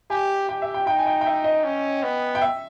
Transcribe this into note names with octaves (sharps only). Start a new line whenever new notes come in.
G4 G#5
G4 G5
E5
G5
D#4 G5
G#5
G5
G5
E5
D#5
C#4
B3
G5
E5